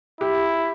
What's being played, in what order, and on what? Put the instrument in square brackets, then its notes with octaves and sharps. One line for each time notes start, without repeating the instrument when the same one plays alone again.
[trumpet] E4 [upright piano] G4